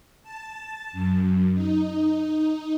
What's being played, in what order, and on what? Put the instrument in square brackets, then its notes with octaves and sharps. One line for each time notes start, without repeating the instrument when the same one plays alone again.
[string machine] A5
F#2
D#4